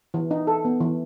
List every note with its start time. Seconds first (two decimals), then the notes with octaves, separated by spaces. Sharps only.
0.14 E3
0.31 D#4
0.47 A4
0.65 B3
0.80 E3